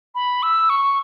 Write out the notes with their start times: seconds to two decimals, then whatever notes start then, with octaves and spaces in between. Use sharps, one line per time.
0.15 B5
0.43 E6
0.70 C#6